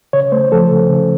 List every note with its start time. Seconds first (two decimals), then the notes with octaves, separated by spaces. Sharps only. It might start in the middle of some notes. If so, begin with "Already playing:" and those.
0.13 C#3 C#5
0.32 A3 C5
0.52 F3 A4
0.71 C#3
0.90 C#3